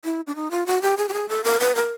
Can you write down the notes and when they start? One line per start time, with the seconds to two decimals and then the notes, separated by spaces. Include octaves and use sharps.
0.04 E4
0.27 D4
0.36 D#4
0.51 F4
0.66 F#4
0.82 G4
0.97 G#4
1.09 G4
1.13 G#4
1.29 A4
1.44 A#4
1.60 B4
1.75 A#4